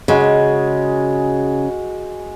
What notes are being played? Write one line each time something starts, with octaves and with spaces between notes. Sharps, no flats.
C#3 G#3 F#4